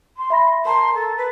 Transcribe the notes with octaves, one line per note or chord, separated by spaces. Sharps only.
C6
E5 B5 A#6
A#4 A5 A#5 C6
A4
B4